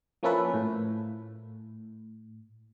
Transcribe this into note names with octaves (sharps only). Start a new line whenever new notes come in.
F3 A#3 C#4 E4 A4 B4
A2